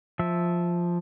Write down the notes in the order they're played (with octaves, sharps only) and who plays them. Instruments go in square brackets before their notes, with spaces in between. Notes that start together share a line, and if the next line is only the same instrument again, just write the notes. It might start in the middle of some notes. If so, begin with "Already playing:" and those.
[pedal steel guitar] F3 E5